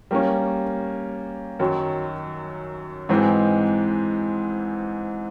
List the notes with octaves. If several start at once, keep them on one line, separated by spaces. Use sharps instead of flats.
G3 A#3 C#4
F#2 D#3 F#3
G#2 E3 G#3 C4